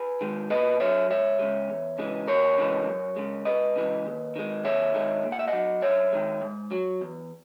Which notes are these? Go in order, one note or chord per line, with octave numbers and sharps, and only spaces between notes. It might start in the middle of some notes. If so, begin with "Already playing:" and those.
Already playing: G#4 B4
D#3 G#3
A#2 B4 D#5
F#3 C#5 E5
C#2 C#5 E5
C#3 E3 G#3
E2
C#3 E3 G#3
D#2 A#4 C#5
C#3 E3 G#3
F#2
C#3 G#3
C#2 B4 D#5
C#3 E3 G#3
D#2
D#3 G#3
D#2 C#5 E5
D#3 G#3
A#2
F#5
E5
D#5 F#5
F#3
F#2 C#5 E5
D#3 G#3
G#2
F#3
E2